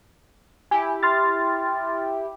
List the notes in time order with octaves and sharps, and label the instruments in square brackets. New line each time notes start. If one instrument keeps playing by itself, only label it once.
[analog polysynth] E4 G4 [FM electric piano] G#5
[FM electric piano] C6 F6 A6